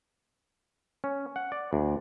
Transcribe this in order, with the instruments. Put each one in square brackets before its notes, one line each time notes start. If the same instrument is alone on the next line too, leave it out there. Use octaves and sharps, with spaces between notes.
[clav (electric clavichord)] C#4
F#5
D5
D2